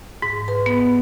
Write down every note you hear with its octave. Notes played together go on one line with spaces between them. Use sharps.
G#2
B4
B3